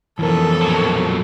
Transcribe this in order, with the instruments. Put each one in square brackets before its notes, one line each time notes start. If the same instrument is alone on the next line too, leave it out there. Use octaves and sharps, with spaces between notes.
[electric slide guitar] F2 B2 [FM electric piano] E3 A#4 [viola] A4
[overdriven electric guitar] A#2 F#3